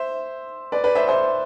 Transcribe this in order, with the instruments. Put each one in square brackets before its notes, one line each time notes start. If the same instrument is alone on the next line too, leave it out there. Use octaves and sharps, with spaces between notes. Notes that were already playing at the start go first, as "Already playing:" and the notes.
Already playing: [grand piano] C5 E5
B4 D5
B4 D5
C5 E5
C5 E5